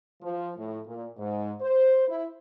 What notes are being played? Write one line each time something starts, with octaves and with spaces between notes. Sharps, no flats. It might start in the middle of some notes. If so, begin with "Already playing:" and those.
F3
A2
A#2
G#2
C5
E4